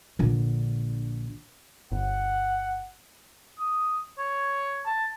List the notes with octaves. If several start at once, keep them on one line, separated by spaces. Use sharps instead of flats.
A#1 D3
G1 F#5
D#6
C#5
A5